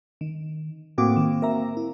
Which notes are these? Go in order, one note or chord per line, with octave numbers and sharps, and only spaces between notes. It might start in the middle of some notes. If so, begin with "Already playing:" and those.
D#3
A2 A#3 C4 F#4 D6
D#3
A#4 E5 A#5
E4